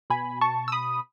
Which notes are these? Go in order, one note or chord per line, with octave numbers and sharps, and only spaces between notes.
B2 G#5 B5
A5 C#6
E6
B5 D#6